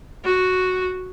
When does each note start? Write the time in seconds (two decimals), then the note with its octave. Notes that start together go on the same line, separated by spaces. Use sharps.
0.24 F#4